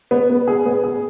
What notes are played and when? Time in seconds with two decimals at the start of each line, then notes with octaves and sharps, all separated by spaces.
0.11 B3
0.30 B3
0.47 G#4
0.66 B3
0.83 G#4